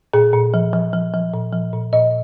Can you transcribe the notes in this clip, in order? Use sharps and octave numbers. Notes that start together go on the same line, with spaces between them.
A#2 G#4
A#2
F3
F3
F3
F3
A#2
F3
A#2
A#2 D#5